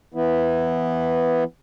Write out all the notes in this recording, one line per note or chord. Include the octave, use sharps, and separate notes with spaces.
E3 B3 E4